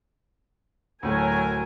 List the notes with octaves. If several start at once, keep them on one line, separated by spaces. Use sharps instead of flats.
D2 A2 F#3 A3 A#4 G#5